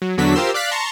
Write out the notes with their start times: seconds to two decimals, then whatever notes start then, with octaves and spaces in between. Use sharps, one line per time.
0.02 F#3
0.17 E2 D3 F#3 D4 F#4 B6
0.35 F4 G4 A#4 C5 C6 E6
0.54 D5 F5 F#6 B6
0.71 A5 A#5 C6 C#6